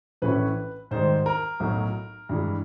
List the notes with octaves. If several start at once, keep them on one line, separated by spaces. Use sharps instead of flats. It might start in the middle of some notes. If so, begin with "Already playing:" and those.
A#1 A2 E3 A3 C#4 B4
G#2 D#3 G3 C5
A#4
B1 A2 F#3
G2 E3 G#3